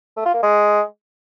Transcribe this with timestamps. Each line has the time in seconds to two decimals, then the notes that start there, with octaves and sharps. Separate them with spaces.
0.17 A3
0.26 F4
0.34 A#3
0.43 G#3